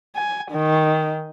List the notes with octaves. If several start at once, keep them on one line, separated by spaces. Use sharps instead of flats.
G#5
D#3